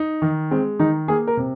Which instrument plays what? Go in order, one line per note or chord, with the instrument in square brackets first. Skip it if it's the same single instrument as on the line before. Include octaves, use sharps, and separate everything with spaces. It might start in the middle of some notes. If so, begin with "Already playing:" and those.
Already playing: [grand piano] D#4
D#3
[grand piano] G#3 [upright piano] C4
[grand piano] D#3 [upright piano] D#4
[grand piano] A#3 [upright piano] G#4
[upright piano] A#4
[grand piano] C3